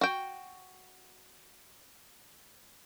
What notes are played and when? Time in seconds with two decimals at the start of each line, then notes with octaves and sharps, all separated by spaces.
0.01 F#4 G5